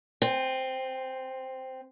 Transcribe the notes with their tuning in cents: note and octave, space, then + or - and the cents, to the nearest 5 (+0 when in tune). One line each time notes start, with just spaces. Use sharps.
C4 -5 G#5 -30